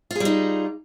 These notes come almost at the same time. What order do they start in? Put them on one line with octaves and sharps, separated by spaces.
F4 G#4 G3 D#4